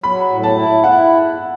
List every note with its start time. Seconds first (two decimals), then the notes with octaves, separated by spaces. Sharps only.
0.04 F#3 B5
0.30 A2
0.43 A5
0.57 E4
0.84 E4 F#5